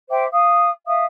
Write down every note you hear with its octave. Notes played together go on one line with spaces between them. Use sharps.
C5 E5 G5 D6
F5 D#6
E5 F5 D#6